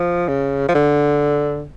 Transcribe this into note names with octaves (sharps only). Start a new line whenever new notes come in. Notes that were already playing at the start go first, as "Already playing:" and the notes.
Already playing: F3
C#3
F3
D3